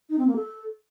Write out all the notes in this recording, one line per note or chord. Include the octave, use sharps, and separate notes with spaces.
D#4
C4
A#3
A4